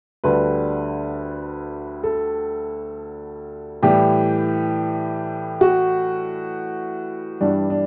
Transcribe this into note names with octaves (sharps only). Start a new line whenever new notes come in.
D2 D3 G3 B4
A4
A2 E3 G3 G4
F#4
G2 E3 G3 D4
D4